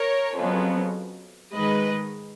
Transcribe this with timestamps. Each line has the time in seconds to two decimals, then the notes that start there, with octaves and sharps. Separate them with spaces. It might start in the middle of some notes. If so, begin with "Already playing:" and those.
Already playing: A#4 C#5
0.36 F2 C#3 F#3 B3
1.53 G#2 D#3 G#3 B4 D#5